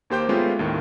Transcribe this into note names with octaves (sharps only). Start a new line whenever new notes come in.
D#2 A#3 G4 C5 G5 G6
G#3 A3 B3 C#4 F4
D#2 A2 D#3